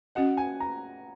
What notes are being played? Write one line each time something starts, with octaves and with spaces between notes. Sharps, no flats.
C#4 F#4 D#5 F#5
G#5
A#5